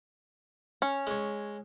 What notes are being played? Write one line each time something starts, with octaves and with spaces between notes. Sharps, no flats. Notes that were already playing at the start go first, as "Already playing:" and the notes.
C#4
G#3 C#5